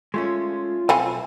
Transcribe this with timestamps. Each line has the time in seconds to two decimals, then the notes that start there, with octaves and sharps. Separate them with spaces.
0.14 G#3 A3 C#4 F4
0.89 B1 F3 C4 E4 A4 G#5